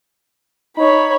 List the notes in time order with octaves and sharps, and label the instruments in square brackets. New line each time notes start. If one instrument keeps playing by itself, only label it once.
[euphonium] D#4 [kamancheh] C#5 B5